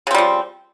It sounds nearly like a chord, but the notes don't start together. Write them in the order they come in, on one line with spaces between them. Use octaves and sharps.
C#3 C4 G3 F3